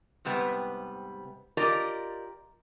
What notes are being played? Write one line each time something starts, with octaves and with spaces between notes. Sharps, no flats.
G#2 C3 G3 B3
F4 G4 A#4 D5 D#5